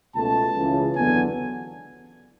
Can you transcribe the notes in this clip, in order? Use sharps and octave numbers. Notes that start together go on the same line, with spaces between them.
C#2 B2 A3 A5
C#2 C#3 E3
E2 D3 F#3 B3 G#5